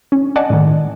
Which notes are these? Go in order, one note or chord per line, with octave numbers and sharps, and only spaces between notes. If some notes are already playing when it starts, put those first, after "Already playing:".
C#4
D5 D#5 F#5 G#5 A5
A2 D#3